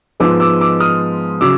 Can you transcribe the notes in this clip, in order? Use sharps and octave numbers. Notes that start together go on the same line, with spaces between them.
G#2 F3 G#3 B3 D6 E6
D6 E6
D6 E6
D#6 F6
C#3 F#3 D6 E6